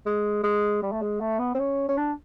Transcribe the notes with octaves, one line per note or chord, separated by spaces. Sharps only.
G#3
G#3
G3
A3
G#3
A3
B3
C4
C#4
C#4
D4